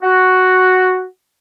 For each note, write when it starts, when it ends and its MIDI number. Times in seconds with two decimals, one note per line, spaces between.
0.02 1.03 66